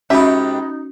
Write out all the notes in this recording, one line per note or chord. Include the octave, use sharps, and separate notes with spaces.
G#2 B3 C#4 D#4 F#4 G4 E5